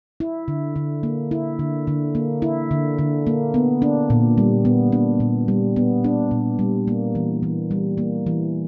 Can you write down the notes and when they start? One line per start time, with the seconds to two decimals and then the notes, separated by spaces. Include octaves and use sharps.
0.20 E4
0.48 D3
0.76 D3
1.03 A#3
1.31 E4
1.59 D3
1.87 D3
2.15 A#3
2.42 E4
2.71 D3
2.98 D3
3.27 A#3
3.54 B3
3.82 D4
4.10 A#2
4.38 G3
4.65 B3
4.92 D4
5.20 A#2
5.48 G3
5.76 B3
6.04 D4
6.31 A#2
6.59 G3
6.88 A#3
7.15 E3
7.43 E3
7.71 G3
7.98 A#3
8.27 E3